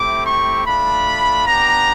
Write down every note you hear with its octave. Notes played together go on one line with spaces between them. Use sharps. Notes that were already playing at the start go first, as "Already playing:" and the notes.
Already playing: A3 C4 E4 G4 D6
C#6
A3 D4 F4 B5
B3 D4 G4 A#5